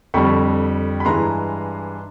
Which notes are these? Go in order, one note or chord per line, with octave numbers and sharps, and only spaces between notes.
F2 D3 G3 B5 C#6
B5
G2 E3 G#3 A#5 C6